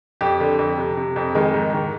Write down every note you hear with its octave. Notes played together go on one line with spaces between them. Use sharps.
F2 G4
D3
F2
C3
C3
F2
D#3 G#3
G#2
D#3